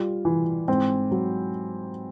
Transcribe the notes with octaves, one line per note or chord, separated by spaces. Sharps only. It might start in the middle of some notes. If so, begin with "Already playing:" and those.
Already playing: G3 F4
E3
G#2 C4
F#3